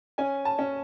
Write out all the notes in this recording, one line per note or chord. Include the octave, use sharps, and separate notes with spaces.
C#4 G#5
A5
C#4